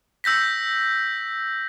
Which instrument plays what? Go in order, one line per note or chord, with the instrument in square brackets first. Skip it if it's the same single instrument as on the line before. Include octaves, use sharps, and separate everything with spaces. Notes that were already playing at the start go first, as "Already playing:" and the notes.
[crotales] E6 G6 A#6 B6